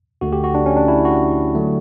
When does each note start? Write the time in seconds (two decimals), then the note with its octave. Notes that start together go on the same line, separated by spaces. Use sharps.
0.21 D2 D3 A3 F#4
0.33 G4
0.44 F#4
0.55 D4
0.66 C#4
0.77 D4
0.88 E4
1.05 F#4
1.55 D3 F#3 A3